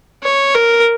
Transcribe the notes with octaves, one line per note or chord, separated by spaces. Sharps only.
C#5
A#4